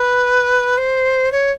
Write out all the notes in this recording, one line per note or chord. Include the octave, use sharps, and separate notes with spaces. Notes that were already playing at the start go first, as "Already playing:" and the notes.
Already playing: B4
C5
C#5